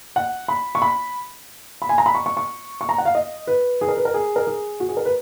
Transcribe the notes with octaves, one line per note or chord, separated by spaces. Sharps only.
F#5
B5
C#6
B5
B5
G#5
A#5
B5
C#6
C#6
C#6
C#6
A#5
F#5
F5
D#5
B4
G#4
A#4
B4
A#4
G#4
A#4
G#4
F#4
G#4
A#4
B4